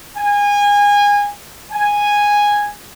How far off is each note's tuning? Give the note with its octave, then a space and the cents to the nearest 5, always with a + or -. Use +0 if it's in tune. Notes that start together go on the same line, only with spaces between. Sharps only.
G#5 -25
G#5 -5